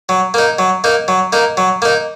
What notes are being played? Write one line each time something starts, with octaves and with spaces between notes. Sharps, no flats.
F#3
A#3 D#4
F#3
A#3 D#4
F#3
A#3 D#4
F#3
A#3 D#4